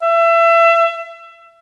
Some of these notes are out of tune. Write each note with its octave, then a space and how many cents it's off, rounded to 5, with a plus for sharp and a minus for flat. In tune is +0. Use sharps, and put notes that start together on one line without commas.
E5 +30